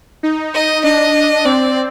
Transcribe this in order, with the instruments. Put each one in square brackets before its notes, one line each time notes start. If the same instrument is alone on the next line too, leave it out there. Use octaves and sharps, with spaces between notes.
[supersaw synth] D#4
[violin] D#5
[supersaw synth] D4 [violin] D#5
[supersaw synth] C4 [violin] D5